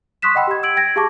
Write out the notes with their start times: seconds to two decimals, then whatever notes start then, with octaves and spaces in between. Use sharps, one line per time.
0.22 C6 C#6 D#6 F#6 B6 E7
0.35 D#5 F#5 G5 B5 E6
0.47 G4 G#6
0.63 E6 G#6 D7 F#7
0.76 G5 G#6 A#6 D7
0.96 G4 G#4 F5 A5 C#6 D6